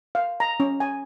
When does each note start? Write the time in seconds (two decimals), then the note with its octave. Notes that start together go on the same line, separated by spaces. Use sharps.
0.15 F5
0.40 A#5
0.60 C#4
0.80 G#5